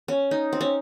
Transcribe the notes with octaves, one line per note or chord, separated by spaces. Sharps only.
C#4
D#4
C4
C#4